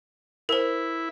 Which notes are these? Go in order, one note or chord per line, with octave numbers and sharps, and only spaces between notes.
E4 A#4 C5